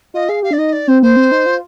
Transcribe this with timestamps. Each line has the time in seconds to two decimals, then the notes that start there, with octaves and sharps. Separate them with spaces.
0.14 F4 D#5
0.29 G#4 F5
0.43 G4 F5
0.51 D4 D5
0.58 D#4 D#5
0.72 D5
0.88 C4 C5
1.02 A#3 C5
1.16 C4
1.32 D#4
1.46 F4